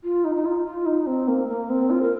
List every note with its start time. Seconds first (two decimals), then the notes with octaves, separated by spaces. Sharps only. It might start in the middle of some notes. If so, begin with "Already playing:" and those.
0.04 F4
0.24 D#4
0.35 D#4
0.46 F4
0.65 F4
0.86 D#4
1.07 C4
1.28 A#3
1.49 A#3
1.70 C4
1.90 F4
2.02 A#4